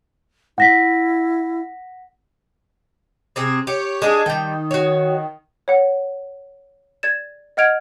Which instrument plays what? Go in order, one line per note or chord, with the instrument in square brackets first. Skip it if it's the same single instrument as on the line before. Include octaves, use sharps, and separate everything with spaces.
[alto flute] E4 [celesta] F#5 A#6 B6
[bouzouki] C3 C4 G#4
[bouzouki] G4 [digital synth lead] C#5
[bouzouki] G#3 D4 [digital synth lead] G#4
[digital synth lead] D#3 [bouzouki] G3 G5
[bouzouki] F#4 C#5
[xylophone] C#5 F#5
D5 G#6 A6 E7
D#5 F#5 F6 G#6 D7 F7